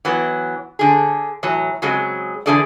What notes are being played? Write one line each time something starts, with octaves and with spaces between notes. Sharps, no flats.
E3 F#3 B3
D3 G#4
A2 E3 F#3
C#3 F#3 G#3 C4 G#4
D3 E3 D4 G#4 A4 D5